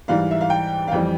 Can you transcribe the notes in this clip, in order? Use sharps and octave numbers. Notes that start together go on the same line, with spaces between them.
G#2 E3 G3 F5
E5
F5
G5
F5
F2 E3 G3 G5